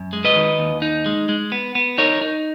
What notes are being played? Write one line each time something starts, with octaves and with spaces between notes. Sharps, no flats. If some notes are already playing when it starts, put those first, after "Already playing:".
Already playing: F#2
G#3
B4 D#5
D#3
D#2
D#4
G#3
G#3
B3
B3
D#4 A#4 C#5
D#4